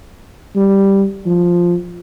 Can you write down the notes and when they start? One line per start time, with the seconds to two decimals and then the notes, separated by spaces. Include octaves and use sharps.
0.56 G3
1.26 F3